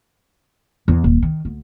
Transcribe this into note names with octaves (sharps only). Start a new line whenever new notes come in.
E2
D#1
D#3
D2